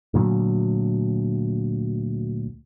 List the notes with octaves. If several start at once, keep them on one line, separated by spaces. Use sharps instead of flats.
D2 A#2 F#3